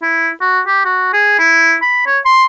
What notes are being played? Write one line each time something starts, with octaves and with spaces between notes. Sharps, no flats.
E4
F#4
G4
F#4
G#4
E4
B5
C#5
C6